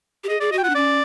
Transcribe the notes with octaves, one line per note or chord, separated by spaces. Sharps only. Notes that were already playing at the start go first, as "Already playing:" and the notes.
G4
G#4 D#5
G#4 D5
F#4 D#5
G5
F4 F#5
D4
C#4 D5